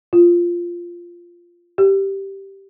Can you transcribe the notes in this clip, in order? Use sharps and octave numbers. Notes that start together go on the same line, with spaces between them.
F4
G4